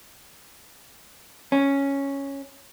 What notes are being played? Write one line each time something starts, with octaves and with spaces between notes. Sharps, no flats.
C#4